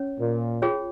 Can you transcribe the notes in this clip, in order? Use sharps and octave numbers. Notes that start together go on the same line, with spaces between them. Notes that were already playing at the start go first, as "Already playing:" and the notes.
Already playing: C#4 C#5
A#2
F4 G#4 C#5 G5